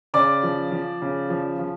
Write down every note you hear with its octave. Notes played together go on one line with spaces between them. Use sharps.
C#3 D5 D6
F3
F3
C#3
F3
F3